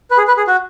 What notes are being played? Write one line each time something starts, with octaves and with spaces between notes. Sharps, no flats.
B4
G#4
B4
G#4
F#4